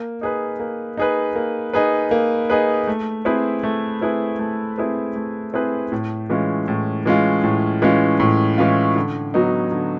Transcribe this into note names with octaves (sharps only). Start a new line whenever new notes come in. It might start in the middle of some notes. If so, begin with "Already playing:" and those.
Already playing: A#3
D#4 G#4 B4
A#3
D#4 G#4 B4
A#3
D#4 G#4 B4
A#3
D#4 G#4 B4
A3
C4 E4 G#4 B4
A3
C4 E4 G#4 B4
A3
C4 E4 G#4 B4
A3
C4 E4 G#4 B4
A2
E3 G#3 C#4 F4
A2
E3 G#3 C#4 F4
A2
E3 G#3 C#4 F4
A2
E3 G#3 C#4 F4
D3
F#3 B3 D#4
D3